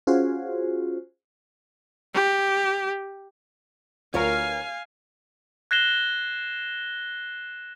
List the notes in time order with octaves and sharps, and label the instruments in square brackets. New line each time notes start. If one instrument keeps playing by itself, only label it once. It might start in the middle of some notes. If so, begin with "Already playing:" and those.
[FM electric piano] C#4 F4 F#4 G#4 C5
[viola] G4
[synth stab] D2 A#4 F6 [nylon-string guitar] F4 B4 C#5 [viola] F5 G#5
[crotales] F#6 G#6 A#6 C7 E7 G7